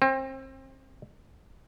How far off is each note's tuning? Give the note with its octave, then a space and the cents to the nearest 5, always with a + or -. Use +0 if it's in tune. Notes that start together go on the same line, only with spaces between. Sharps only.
C4 +30